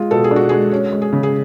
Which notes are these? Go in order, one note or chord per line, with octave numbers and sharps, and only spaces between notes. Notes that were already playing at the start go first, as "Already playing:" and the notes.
Already playing: G#3 F4
B2 A4
G#4
D4
F#4
G#3 G#4
C#4
G#3
G#4
C#3
G#4